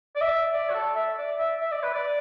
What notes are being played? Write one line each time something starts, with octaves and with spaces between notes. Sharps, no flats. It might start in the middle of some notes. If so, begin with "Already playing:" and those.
D5
E5
D5
F#4
A4
E5
D5
E5
E5
D5
B4
D5